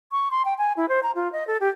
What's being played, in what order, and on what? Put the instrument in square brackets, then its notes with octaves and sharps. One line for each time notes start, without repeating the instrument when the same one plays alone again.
[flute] C#6
C6
G5
G#5
E4
C5
A#5
F4
D#5
A4
G4